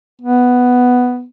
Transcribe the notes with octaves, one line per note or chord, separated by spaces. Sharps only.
B3